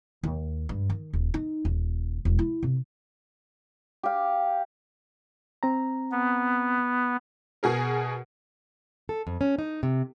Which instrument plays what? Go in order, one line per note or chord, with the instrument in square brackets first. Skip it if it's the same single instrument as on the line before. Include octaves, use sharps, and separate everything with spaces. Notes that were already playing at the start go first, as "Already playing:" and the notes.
[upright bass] D#2
G2
D#3
D#1
D#4
D#1
E1
E4
C3
[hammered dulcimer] G4 F5
[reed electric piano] C4 A#5
[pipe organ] B3
[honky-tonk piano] B2 G#4 A#4
[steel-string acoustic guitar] A4
F2
C#4
D#4
C3